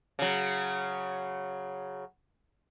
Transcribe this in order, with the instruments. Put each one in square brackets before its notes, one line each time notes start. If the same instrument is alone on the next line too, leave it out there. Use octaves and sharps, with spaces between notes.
[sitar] C#3 F#3